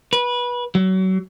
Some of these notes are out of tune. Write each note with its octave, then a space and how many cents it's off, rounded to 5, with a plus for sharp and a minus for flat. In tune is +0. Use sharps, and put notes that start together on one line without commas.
B4 -20
F#3 +30